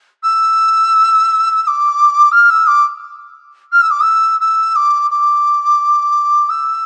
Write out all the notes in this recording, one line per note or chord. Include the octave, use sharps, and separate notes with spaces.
E6
E6
D6
F6
E6
D6
F6
E6
D6
E6
E6
D6
D6
E6